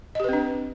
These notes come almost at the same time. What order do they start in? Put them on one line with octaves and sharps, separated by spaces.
D#5 G4 B4 C4 D4